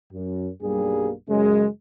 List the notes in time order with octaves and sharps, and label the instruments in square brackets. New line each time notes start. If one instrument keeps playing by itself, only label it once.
[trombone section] F#2
B1 G2 G3 A#3 G#4
F#2 C#3 G#3